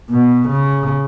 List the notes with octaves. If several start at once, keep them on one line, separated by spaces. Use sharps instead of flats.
B2
C#3